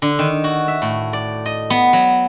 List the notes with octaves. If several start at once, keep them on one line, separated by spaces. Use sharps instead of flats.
D3
D#3
F#4
E5
A2
D5
D#5
B3
F#3